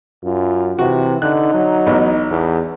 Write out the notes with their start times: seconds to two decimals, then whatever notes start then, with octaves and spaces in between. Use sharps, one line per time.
0.24 F#2 F4
0.79 C3 E3 F#4
1.22 D3 D#4 F#6
1.54 F#3
1.87 A1 B3
2.31 E2